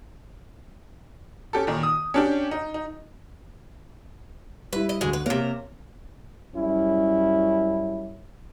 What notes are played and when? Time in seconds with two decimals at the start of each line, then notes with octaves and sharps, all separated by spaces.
1.53 C#4 G4 A4
1.67 A#2 D#3
1.83 D#6
2.14 C#4 D4 G4
2.51 D#4
2.74 D#4
4.73 G3 E4 B4
4.89 D#5
5.01 D2 G#3 F#4
5.13 B4
5.26 C3 A#3 A#4 C#5
6.54 F#2 G3 C#4 E4